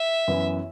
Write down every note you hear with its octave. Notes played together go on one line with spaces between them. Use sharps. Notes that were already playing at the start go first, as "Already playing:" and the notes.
Already playing: E5
F#2 E3 B3 E4